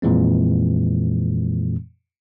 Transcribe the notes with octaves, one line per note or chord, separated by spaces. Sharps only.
F2 A#2 E3 G#3 C4